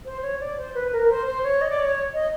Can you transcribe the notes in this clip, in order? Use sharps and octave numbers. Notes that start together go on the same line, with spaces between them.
C5
C#5
D5
C5
B4
A#4
C5
C5
C#5
D#5
D5
C#5
D#5